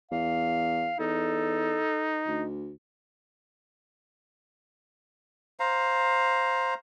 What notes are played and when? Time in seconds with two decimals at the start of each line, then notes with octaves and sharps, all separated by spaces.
0.11 E2 F5
1.00 E2 D#4 A4
2.28 D2
5.60 C5 F5 A#5